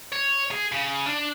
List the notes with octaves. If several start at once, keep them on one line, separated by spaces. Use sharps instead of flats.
C#5
G#4
C#3
D4